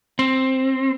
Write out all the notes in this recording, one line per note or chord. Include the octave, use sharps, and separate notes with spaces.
C4